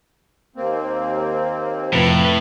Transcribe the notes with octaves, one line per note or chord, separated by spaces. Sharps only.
D#2 A#3 C4
F2 A2 C3 F3 B4